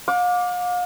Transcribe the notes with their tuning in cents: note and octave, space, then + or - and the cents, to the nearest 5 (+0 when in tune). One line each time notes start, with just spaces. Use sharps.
F5 +40 D6 -5